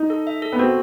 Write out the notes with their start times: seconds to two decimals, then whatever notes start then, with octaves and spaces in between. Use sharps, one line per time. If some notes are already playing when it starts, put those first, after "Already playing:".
Already playing: D#4
0.10 A4
0.27 E5
0.42 A4
0.52 B3
0.59 C4 F#4